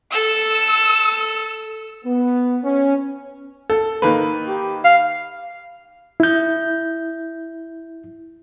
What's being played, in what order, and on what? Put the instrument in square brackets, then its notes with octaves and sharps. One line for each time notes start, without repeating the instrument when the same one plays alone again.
[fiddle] A4 [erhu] E6
[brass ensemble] B3
C#4
[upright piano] A4
D#3 A#3 B4
[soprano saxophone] G4
F5
[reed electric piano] E4 G6